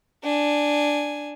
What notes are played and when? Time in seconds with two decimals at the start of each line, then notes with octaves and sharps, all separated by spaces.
0.24 D4 G#5